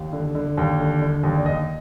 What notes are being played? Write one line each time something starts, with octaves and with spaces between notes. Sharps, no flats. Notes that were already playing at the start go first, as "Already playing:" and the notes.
Already playing: D#2 F5
D3
D3
D#2
D3
D3
D#2
D5
D#2 D#5